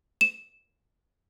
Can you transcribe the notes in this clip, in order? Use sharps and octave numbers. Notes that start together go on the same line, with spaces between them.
E7